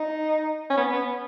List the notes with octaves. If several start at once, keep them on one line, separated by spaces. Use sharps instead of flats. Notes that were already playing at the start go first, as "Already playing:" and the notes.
Already playing: D#4
C#4
B3
B3